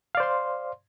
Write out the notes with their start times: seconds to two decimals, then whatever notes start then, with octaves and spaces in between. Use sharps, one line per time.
0.15 F5
0.17 D5
0.20 C5
0.23 C6